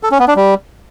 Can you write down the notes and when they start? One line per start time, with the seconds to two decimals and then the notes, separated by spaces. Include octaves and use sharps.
0.03 A4
0.12 C#4
0.20 B3
0.28 D4
0.36 G3